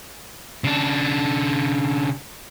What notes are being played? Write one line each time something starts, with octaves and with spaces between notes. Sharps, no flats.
C#3 D4